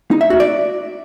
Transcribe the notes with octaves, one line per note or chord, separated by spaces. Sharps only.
D#4
E5
F#4
D5